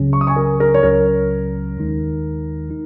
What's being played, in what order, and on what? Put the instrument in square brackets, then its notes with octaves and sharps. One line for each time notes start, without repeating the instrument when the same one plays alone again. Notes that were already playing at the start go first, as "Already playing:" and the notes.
Already playing: [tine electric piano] C#2 C#3 F#3 C#4
[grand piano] C#6
D#6
G#5 C#6
A#4
A#4
C#5
[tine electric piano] C#2 C#3 F#3 C#4 [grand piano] A#4
[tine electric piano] D#2 D#3 G#3 D#4
D#4